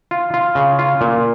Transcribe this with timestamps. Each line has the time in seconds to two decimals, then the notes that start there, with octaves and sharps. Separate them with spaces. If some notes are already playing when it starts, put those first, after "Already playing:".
0.11 F4
0.34 F4
0.55 C#3
0.79 F4
1.01 A#2